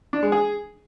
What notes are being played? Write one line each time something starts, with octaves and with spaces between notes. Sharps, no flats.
D4
G#3
G#4